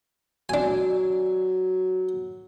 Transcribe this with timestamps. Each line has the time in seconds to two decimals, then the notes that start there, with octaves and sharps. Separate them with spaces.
0.49 F#3 D4 G#5